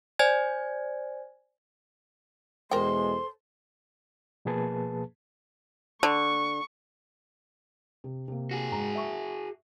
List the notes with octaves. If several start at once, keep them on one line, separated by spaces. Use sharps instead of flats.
C5 D5 G#5 G#6
E2 B2 G#3 A4 A#4 C5 G5 C6
B2 F3 A#3 G#4 B4 A5
D3 C#6
C3
C3 A#3
F#4 G#4
G#2 A#5
E5 C#6